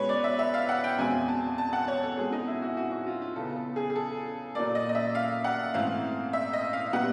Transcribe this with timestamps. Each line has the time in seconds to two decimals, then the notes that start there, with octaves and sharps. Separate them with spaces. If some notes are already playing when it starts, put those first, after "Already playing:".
Already playing: B2 G#3 B3 B4 C#5
0.09 D5
0.24 E5
0.39 E5
0.54 F5
0.69 F#5
0.84 G5
0.98 E2 B2 G#3 C4 G#5
1.28 A5
1.58 A5
1.73 F#5
1.88 C#5
2.03 A4
2.17 B2 G#3 C4 G#4
2.32 D#4
2.47 E4
2.62 F#4
2.77 F#4
2.92 F#4
3.07 F4
3.21 F4
3.36 C#3 F#3 B3 A4
3.56 A4
3.76 G#4
3.90 G#4
3.95 A4
4.55 A#2 F#3 A#3 D5
4.75 D#5
4.89 D#5
4.95 E5
5.15 F5
5.44 F#5
5.74 G#2 E3 A3 C4 F5
6.33 E5
6.53 D#5
6.73 F5
6.93 A#2 G3 B3 F#5